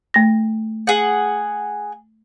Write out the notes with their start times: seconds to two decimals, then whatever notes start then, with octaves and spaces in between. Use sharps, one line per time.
0.14 A3 A#6
0.87 G#4 F#5